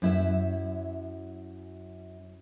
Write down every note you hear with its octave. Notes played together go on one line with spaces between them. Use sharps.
F#2 E4 E5